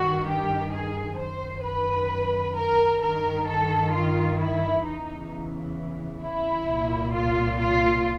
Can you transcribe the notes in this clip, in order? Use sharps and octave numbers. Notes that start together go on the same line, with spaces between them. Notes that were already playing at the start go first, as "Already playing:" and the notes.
Already playing: G2 D#3 F#4
G4
G#4
F#2 D#3 C5
B4
A#4
G2 D#3 A#4
A4
F4
E4
E2 C#3 E3 D#4
E4
C2 A#2
F4
F4